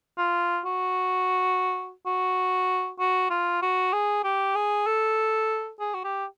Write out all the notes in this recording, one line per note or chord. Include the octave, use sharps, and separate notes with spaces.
F4
F#4
F#4
F#4
F4
F#4
G#4
G4
G#4
A4
G#4
F#4
G4